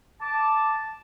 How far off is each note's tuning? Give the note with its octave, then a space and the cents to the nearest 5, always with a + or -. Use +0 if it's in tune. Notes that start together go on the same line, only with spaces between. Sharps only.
A5 -5 D6 +0